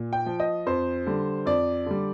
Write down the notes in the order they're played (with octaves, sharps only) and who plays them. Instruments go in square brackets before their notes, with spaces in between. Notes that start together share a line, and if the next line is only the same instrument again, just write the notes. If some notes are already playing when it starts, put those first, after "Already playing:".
Already playing: [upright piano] A#2
G5
F3
D#5
F2 C5
D3 G3
F2 D5
D3 G3